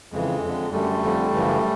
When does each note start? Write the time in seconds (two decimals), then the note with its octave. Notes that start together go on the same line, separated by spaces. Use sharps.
0.12 F2 C#3 E3 G#3
0.43 F2 D3
0.72 F#2 D3 G3 A3
1.02 F2 D3
1.33 F#2 C#3 E3